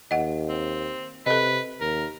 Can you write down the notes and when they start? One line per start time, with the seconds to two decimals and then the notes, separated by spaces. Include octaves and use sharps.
0.11 D#2 D#5 F#5
0.49 C4
1.26 C3 A4 B4 D#5
1.81 D#2 A#4